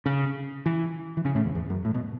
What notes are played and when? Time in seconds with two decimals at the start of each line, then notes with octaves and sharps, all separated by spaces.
0.06 C#3
0.66 E3
1.17 E3
1.25 C#3
1.35 A2
1.45 E2
1.55 E2
1.70 F#2
1.85 A2
1.94 B2